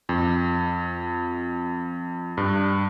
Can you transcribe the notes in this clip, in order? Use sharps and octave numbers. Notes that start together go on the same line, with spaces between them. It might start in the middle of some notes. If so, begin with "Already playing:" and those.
F2
G2